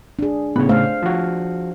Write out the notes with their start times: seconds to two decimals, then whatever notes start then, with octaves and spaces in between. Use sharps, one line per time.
0.19 D4 G#4
0.56 A2 C#3 B3 C#5
0.69 A3 C5 F5
1.03 F3 F#4